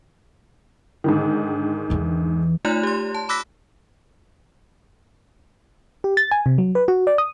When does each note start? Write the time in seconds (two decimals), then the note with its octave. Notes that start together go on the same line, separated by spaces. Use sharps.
1.04 G#2 D3 D#3
1.90 E2 E3
2.65 A3 D#4 F4 C#5 D5 F#6
2.83 G4 C6
3.14 A5
3.29 B5 D6 E6 F#6 A#6 B6
6.04 G4
6.17 A6
6.31 G#5
6.46 C3
6.58 F#3
6.75 B4
6.88 F#4
7.07 D5
7.18 D#6